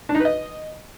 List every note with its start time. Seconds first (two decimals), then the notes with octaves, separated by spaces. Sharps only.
0.09 D4
0.14 D#4
0.20 B4
0.25 D#5